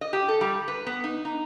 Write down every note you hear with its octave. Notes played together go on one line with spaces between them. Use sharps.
D#5
G4
A4
G3
B4
B3
D#4
D#4